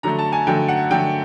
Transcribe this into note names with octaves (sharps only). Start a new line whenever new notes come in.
D3 F#3 A3 A#5
A5
G#5
D3 F#3 A3 G5
F#5
D3 F#3 A3 G5